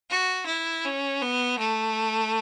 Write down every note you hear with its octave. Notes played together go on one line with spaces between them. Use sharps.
F#4
E4
C#4
B3
A3